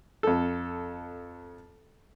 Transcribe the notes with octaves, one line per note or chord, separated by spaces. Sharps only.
F2 A4